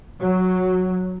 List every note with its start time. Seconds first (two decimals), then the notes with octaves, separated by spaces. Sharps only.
0.20 F#3